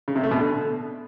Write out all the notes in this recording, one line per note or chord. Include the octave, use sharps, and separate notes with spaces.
C#3
C3
A3
B2
D3